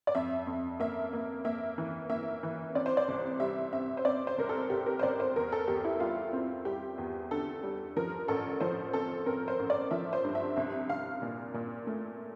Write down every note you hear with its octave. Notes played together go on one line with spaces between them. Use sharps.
D5
F2 E5
F2
A#3 E5
A#3
A#3 E5
E3
A#3 E5
E3
C4 D5
C5
D5
C2
G3 E5
C4 E5
C5
C4 D5
C5
C2 A#4
A4
C2 G4
A#4
C5
C2 D5
C5
E2 A#4
A4
E2 G4
E4
G3 F4
C4
G3 G4
E2
D3 A4
G3
F3 A#4
A1 A4
F3 C5
C4 A4
C4 A#4
C5
A1
D5
F3 E5
C5
G2
E5
C2 E5
C2 F5
A#2
A#2
A3